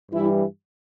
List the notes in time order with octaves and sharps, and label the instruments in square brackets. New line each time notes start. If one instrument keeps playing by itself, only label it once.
[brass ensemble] G2 E3 G3 E4